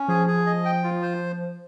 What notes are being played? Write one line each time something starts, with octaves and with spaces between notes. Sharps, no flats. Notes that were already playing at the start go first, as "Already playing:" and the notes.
Already playing: C#4
F3 G#4
G#4
D#5
G5
F4
C5